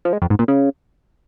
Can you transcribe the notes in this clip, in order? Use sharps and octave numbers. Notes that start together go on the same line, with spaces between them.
F3
G#3
F2
G#2
A#2
C#3